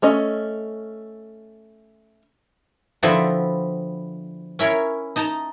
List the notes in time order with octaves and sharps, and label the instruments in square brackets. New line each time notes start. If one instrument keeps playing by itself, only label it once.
[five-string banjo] A3 C#4 D#5
[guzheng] D3 F3 B3 C4 E4 F#4
C#4 E4 A#4 C#5
D#4 D#5 A5 A#5